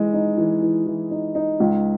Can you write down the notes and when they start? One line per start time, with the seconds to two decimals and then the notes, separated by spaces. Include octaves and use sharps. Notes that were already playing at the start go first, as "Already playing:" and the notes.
Already playing: E3 G#3
0.13 D#4
0.37 E3
0.62 E3
0.87 E3
1.11 D#4
1.35 D#4
1.60 C#2